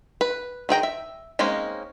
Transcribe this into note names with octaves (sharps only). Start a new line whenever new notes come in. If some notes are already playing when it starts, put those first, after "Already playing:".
B4
D#3 G#4 G5 A#5
E5
G#3 A#3 C4 C#4 D#4